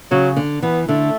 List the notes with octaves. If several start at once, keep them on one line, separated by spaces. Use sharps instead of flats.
C#3 F#3
D3
E3 B3
D3 A3